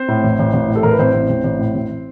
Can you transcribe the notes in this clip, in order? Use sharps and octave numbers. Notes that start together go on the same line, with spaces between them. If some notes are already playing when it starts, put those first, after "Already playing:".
Already playing: C4 C5
A2
A1
A1
A1
A2
A4
A1 A#4
B4
A1 C4 C5
A1
A1
A1
A2
A1